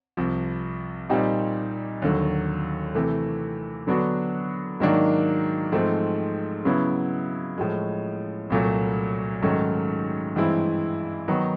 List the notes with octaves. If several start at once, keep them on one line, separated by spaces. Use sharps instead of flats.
C2 C3 F3
A#2 G3 C4 D#4 G4
D#2 D3 F#3
C3 E3 A3
D3 F#3 B3 D4 F#4
G#2 D#3 F#3 A#3 D4
G#2 F3 A3 C4
C#3 F#3 B3 E4
A2 F3 G#3
C2 A#2 F#3 A3
G#2 D#3 F#3 A3 C#4
G2 E3 G#3 C4 E4
D#3 F#3 B3 D#4